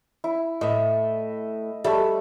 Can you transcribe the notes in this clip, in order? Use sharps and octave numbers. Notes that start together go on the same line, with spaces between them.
E4
A2 D#5 E5
G3 A3 A4 E5